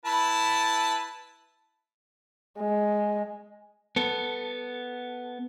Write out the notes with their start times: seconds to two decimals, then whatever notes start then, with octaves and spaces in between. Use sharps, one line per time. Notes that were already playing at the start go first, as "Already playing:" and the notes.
0.05 E4 B4 A5
2.59 G#3
3.96 B3 A4